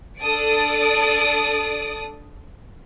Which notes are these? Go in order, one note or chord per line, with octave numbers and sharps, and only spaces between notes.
D4 A4 D5 D#6 D7